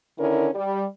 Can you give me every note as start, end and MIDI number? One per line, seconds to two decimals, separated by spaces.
0.19 0.49 50
0.19 0.49 51
0.19 0.49 61
0.19 0.49 64
0.19 0.49 70
0.55 0.85 55